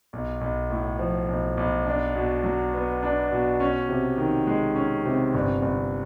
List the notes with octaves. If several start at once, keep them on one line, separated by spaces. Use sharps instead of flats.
B1
B1
A2
F3
B1
B1
D4
B2
F#3
B3
D4
B2
C#4
C3
D#3
G#3
C#4
C3
G1
G1